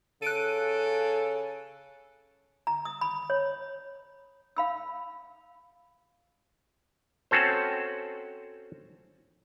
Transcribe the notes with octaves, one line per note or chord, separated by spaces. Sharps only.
C#3 A4 F#6 D7 D#7
A#5
D#6
B5
C#5
F5 B5 E6
C4 C#4 F#4 A4 C5